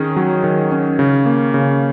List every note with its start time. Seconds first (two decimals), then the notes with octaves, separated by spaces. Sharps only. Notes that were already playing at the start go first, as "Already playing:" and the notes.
Already playing: D#3 C#4 G#4
0.16 F#3
0.44 D#3
0.72 C#4
0.99 C#3
1.26 A#3
1.54 C#3